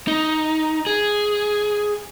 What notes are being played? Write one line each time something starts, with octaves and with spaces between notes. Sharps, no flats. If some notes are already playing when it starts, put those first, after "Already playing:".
D#4
G#4